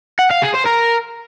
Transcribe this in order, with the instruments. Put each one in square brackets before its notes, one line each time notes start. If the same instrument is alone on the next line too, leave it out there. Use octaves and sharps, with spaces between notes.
[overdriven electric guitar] F#5
F5
G#4
C5
A#4